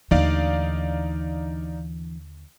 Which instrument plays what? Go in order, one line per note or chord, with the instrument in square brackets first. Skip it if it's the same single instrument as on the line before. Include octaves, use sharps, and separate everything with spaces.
[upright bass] D#2 D3 [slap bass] E3 A3 D4 [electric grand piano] D#4 D5 F5